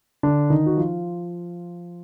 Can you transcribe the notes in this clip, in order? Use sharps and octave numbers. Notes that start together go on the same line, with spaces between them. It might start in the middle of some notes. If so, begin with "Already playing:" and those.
D3 D4
D#3 D#4
F#4
F3 F4